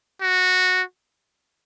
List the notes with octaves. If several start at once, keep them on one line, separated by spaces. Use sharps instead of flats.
F#4